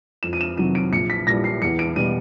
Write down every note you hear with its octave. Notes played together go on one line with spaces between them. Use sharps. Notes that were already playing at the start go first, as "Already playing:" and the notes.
F2 E7
D#7
E7
C3 D#3 F#3 D#7
D7
A#1 C#7
B6
A#2 G3 A#6
C7
E2 C#7
D7
B2 G3 D#7